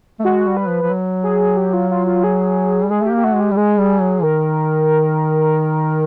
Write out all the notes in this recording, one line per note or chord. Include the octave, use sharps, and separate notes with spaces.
A3
G#3 F#4
G3
B4
F3
F3
F#3
G#4
G4
F4
F4
F4
G#4
G3
G#3 G#4
A3 G4
A#3
G4
A3 F#4
G#3
G4
G3
G#3 G#4
G3
F#3
D#3 A#4